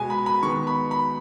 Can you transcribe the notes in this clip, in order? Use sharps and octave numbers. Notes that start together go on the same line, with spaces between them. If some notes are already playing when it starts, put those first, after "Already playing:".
Already playing: B2 G#3 B3 G#5
B5
B5
D#3 G#3 B3 C#6
B5
B5